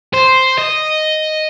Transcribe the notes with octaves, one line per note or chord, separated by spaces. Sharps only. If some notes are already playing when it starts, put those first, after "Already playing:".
C5
D#5